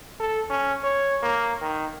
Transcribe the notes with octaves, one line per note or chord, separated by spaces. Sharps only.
A4
C#4
C#5
A#3
D#3